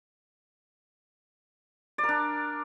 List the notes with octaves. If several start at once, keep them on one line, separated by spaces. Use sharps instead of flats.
D5
A#4
D4